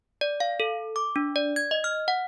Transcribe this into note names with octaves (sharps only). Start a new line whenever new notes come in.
D5
F5
A4
D6
D4
D5
G#6
D#5
F6
F#5